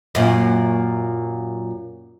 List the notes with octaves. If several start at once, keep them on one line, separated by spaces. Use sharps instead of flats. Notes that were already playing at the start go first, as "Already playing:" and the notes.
F#2 A#2